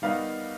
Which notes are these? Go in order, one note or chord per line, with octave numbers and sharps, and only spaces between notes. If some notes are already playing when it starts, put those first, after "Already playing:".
D#3 G3 B3 D#4 F5